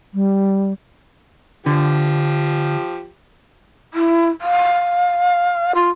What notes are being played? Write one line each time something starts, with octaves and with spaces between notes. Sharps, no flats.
G3
D3 F3 G4
E4
F5
F4